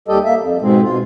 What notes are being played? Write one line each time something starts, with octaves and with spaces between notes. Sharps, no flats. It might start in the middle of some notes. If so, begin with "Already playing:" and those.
D#2 G3 G4 A4 D#5
A#3 E5
F2
G#2 B2 G#3 C4
B2 F4